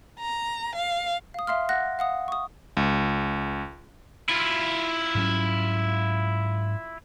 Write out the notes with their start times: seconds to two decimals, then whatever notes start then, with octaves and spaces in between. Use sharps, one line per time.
0.20 A#5
0.76 F5
1.34 F5 D#6
1.47 E5 F5 C6 F6
1.69 F#5 F#6 A#6
1.99 F5 F#5 D#6
2.28 C#6 D#6
2.77 C#2
4.29 E4 F4
5.15 G#2 F#3 C#4